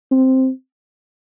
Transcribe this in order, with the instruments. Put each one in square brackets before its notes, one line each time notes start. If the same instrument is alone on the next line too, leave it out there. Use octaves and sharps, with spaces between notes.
[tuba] C4